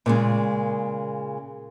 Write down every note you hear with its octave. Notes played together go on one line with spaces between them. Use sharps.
A#2 C#3 G#3